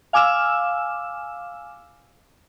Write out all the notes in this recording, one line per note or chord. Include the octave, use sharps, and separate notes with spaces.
F5 G#5 D6 E6 F6 E7